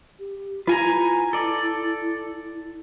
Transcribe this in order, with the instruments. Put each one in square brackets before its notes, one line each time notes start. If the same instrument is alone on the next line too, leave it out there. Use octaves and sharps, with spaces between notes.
[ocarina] G4
[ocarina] E4 [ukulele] F4 [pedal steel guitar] B4 G#5 A#5
[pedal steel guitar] A4 D5